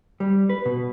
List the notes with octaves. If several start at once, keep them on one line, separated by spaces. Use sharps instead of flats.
G3
B4
B2